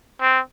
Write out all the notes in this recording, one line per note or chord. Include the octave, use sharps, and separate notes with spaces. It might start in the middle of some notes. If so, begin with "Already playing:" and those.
C4